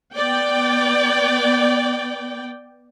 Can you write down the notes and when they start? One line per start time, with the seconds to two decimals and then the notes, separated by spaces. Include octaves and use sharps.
0.15 B3 D5 G5